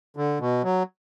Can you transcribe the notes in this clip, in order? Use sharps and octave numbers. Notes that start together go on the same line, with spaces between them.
D3
B2
F#3